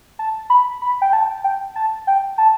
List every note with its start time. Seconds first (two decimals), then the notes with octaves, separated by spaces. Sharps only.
0.19 A5
0.50 B5
0.82 B5
1.02 G5
1.13 A5
1.44 G5
1.76 A5
2.07 G5
2.38 A5